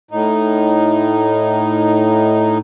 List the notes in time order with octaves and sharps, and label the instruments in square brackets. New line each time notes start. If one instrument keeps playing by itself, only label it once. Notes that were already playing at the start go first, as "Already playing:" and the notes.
[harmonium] A2 D#4